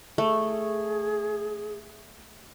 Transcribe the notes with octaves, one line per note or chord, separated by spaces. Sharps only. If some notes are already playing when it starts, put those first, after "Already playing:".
A3 G#4